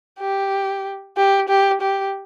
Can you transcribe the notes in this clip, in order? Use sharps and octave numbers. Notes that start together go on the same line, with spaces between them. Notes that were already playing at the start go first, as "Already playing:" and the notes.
G4
G4
G4
G4